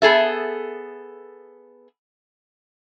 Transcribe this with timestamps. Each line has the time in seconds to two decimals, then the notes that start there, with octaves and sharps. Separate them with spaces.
0.02 B3 G#4 A4 E5